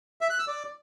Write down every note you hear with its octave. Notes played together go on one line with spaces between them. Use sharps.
E5
F#6
E6
D5